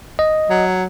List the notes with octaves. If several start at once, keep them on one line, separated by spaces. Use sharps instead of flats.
D#5
F#3